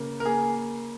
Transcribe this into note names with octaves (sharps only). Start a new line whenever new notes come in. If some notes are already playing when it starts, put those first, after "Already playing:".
Already playing: C#3 A#3
A#4
A#3 G#4